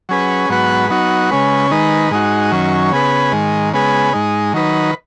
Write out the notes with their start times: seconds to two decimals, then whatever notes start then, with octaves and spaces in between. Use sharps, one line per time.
0.09 F#3 C#4 G#4 B4
0.49 G#2 F#3 B3 F#4 B4
0.90 F#3 B3 D#4 F#4
1.31 C#3 G#3 C#4 B4
1.70 D#3 G#3 D#4 B4
2.11 G#2 G#3 D#4 F#4
2.51 F#2 D#3 F#3 C#4
2.92 C#3 B3 G#4 B4
3.32 G#2 D#3 G#3
3.73 C#3 G#3 B3 G#4 B4
4.13 G#2 G#3 D#4
4.53 D#3 F#3 D#4 B4